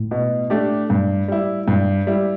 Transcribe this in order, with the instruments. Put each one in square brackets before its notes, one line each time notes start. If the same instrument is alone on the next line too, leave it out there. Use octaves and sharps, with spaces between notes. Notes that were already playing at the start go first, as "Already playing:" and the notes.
Already playing: [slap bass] A2
[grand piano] B2
A3 D4 G4
G2
G3 E4
G2
G3 E4